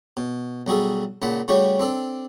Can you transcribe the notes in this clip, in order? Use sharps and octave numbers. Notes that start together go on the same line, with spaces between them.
B2
B1 G3 F#4 G#4 A4
C#2 A#2 F#5 A5 B5
C#3 G3 A3 F#4 G4 C#5
C4 D4 A4